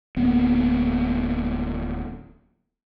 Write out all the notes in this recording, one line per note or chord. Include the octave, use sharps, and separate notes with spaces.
D1 A#3 B3